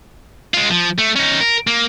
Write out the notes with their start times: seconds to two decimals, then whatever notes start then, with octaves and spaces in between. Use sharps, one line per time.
0.54 G#3 F4
0.71 F3
0.98 A3
1.16 C#4 D#4
1.41 A#4
1.67 A#3